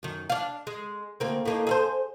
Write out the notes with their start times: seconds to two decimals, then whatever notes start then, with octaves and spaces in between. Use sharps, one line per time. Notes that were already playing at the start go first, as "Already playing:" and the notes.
0.03 F#2 D#3
0.30 D4 F5
0.67 G#3
1.20 D2 A#3 C4
1.45 A2 A#3 D#4
1.67 G#4 A4 C5